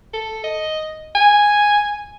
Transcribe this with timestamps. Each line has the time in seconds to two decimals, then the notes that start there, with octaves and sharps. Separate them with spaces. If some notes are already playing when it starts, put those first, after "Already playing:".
0.13 A4
0.44 D#5
1.15 G#5